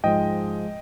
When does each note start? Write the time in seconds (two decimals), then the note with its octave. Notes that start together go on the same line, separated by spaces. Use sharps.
0.04 G#2 F3 G#3 D#5 G5